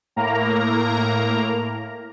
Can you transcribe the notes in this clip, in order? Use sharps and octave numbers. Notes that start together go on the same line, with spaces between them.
A2 A#3 A#4 A#5